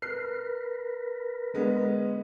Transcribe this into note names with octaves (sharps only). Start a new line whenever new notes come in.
A#4 B4 C7
D3 G#3 B3